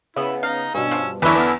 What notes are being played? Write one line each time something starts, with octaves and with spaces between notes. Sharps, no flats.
C#3 B3 E4
D#4 F5
G2 B2 C#4 E6
F3
E2 D3 C#4 D4 E4 B4
E3 B3 F6